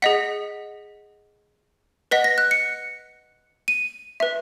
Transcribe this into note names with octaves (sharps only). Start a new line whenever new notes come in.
G#4 D#5 F#5 B6
B4 D#5 F#5 B6
A#6
F#6
C#7
D#7
B4 E5